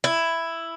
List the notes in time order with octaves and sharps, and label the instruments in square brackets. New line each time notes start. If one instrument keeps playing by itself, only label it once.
[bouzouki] E4